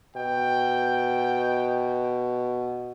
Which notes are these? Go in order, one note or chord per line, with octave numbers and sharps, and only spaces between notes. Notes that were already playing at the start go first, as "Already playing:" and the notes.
B2 G5